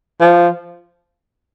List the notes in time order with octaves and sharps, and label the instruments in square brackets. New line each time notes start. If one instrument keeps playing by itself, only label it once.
[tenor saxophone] F3